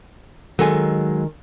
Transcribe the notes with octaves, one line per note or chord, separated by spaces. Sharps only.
D#3 F#3 G#3 A4 G#5